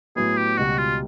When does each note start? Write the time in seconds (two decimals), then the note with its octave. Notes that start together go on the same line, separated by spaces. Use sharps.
0.16 A2 F#3 B3 G#4
0.37 G4
0.58 C#2 B2 G3 F#4
0.78 F4